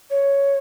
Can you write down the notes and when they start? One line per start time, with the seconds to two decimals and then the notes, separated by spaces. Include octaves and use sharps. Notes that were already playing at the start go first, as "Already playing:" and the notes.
0.11 C#5